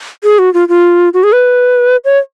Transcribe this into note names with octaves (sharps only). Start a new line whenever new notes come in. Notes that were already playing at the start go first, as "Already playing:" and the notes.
G#4
F#4
F4
F4
F#4
G#4
B4
C#5